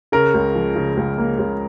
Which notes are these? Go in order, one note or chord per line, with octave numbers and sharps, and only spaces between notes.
C#3 A#4
C#2
F3
C#3
C#2
A#3
C#2